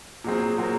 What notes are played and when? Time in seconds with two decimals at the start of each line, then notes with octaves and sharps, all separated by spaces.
0.24 A#2 F#3 C4 G#4
0.58 A#2 F#3 C4 A#4